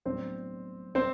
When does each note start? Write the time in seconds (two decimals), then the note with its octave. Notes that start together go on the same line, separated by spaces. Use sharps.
0.05 A2 F#3 B3 C4 D4 C5
0.95 C4 C5